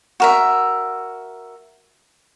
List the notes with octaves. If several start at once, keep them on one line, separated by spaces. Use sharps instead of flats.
F#4 A#4 E5